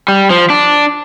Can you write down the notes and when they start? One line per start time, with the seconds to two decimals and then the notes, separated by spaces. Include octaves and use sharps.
0.08 G3
0.30 F3
0.50 D4